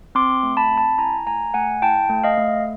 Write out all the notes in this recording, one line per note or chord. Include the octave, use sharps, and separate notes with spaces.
C4 C6 D6
A3
A5 B5
C4
A5 B5
E4 G#5 A#5
A3 G#5 A#5
A3 F#5 G#5
E4 G5 A5
A3
D#5 F5
A3